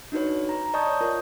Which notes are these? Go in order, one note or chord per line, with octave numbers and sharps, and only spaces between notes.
D4 D#4 F#4 B4 C#5
A#5
D5 D#5 A5 C#6 D#6 G6
C#5
F4 A#4